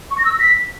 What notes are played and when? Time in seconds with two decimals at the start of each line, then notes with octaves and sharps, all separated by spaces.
0.11 C#6
0.18 A#6
0.25 E6
0.32 A#6
0.40 B6